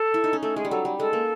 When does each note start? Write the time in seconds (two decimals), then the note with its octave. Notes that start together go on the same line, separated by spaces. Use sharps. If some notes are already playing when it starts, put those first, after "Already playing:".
Already playing: A4
0.14 E4
0.24 D#4
0.33 C#4
0.42 A3 A4
0.56 G#3 G#4
0.65 G3
0.71 F#3 A4
0.85 G3
0.99 G#3 A4
1.13 A#3